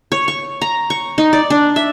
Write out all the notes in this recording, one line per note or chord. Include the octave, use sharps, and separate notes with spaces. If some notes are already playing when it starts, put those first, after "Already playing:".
C#5
C#6
A#5
C#6
D#4
D5
D4
E5